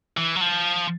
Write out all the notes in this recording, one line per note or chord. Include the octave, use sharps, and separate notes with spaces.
E3
F#3
F3